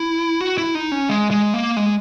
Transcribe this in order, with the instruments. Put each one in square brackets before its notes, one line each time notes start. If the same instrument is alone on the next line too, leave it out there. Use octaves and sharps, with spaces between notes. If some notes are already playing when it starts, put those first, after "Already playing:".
Already playing: [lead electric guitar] E4
F#4
E4
D#4
C#4
G#3
G#3
A#3
G#3